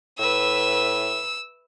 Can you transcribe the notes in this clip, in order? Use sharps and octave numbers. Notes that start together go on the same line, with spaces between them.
A2 B4 E5 E6